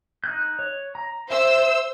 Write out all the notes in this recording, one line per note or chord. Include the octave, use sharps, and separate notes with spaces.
D#4 F#6 G6
C#5
A#5
C5 E5 E6